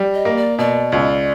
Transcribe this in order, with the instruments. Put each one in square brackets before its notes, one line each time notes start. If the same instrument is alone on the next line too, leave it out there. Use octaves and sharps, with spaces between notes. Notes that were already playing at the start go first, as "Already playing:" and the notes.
Already playing: [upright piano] G3
[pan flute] D#5
[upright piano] A#3
[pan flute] D5
[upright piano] B2 [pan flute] D5
[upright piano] C#2